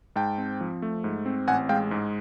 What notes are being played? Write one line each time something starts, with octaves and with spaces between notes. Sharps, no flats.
G#2 G5 A5
C4
F3
A3
G#2
C4
A1 F#5 G#5
G#3 F5 G5
G#2